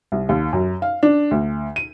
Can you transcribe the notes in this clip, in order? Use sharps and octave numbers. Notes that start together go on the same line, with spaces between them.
C2
D#2
F#2
F5
D4
D2
D#7